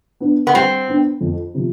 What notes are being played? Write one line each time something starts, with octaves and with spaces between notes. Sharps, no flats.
B3 D4
B3
G3 C4
B3 D4
F2
C3 F3